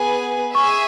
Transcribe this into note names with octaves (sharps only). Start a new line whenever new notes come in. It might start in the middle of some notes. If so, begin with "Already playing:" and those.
Already playing: B3 G#4 B4 G#5
G#4 E5 G#5 C#6